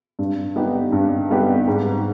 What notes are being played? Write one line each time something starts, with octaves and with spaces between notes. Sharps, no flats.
G2
G3 B3 D#4 G4
G2
G3 B3 D#4 G4
G#2